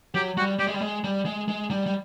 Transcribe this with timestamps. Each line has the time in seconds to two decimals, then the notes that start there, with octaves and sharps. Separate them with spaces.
0.15 F#3 G4
0.37 G3 F#4
0.59 G3 G4
0.67 G#3
0.74 G3
0.81 G#3
1.04 G3
1.25 G#3
1.48 G#3
1.71 G3
1.86 G3